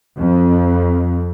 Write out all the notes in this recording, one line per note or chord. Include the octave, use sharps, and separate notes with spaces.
F2